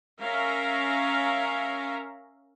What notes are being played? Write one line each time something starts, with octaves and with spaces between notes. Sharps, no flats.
C#4 A#4 E5 F5 A#5